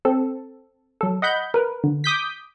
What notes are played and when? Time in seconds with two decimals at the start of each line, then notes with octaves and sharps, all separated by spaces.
0.05 C4 A4
1.01 F#3 A4
1.22 D#5 F#5 B5 G6
1.54 A#4 B4
1.84 D3
2.04 D6 D#6 G6 B6